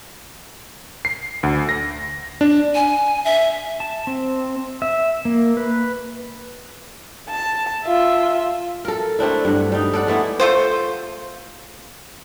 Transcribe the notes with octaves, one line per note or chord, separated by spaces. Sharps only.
C7
D2
A#6
D4
G#5
E5
A5
C4
E5
A#3
B4
A5
F4 E5
A4 A#4
A3 C4 D4 E4
G2 F#5
G3 D#4
A4 D5 F#5
G#3 A3 B3 E4
A3 F4 C5